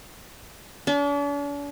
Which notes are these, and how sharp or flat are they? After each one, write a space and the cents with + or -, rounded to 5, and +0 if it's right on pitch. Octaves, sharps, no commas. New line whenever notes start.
D4 -45